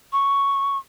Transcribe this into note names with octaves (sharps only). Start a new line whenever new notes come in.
C#6